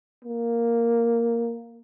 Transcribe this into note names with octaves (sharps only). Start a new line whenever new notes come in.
A#3